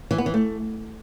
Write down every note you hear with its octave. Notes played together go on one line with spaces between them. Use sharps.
E3
B3
E3
A3